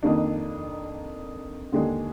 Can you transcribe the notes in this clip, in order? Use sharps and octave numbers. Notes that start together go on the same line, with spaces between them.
F2 D#3 A#3 D4
D#2 D3 G#3 D4 G#4